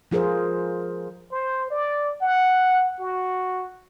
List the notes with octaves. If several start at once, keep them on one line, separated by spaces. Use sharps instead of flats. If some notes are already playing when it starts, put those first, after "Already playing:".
F3 F4 G#4 A#4 C5
C5
D5
F#5
F#4